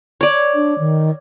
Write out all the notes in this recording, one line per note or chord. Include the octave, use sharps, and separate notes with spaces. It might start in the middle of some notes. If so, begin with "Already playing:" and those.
C#5 D5
D4
D#3